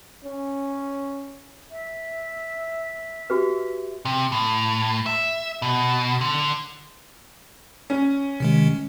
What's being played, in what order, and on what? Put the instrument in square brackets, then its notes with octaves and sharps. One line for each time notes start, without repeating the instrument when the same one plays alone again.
[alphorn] C#4
[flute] E5
[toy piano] F#4 G4 B4
[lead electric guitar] C3
A2
E5
B2
D3
[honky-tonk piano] C#4
[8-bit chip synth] C3 D#3 G#3